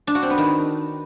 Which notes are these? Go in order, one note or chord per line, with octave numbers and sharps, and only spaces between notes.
D4
F#4
C4
B3
D#3